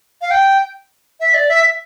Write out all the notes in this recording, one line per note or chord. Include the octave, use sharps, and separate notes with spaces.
F5
G5
E5
D5
E5